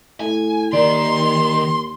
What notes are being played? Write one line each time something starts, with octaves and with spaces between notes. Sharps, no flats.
A2 G#5
D#2 D#3 D5 C6